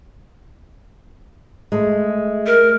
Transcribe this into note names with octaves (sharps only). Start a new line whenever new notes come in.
G#3 A3
A#4